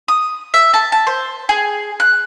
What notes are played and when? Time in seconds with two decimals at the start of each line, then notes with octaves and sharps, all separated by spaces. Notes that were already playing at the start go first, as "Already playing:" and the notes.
0.08 D#6
0.54 E5
0.74 A5
0.92 A5
1.07 C5
1.49 G#4
2.00 F#6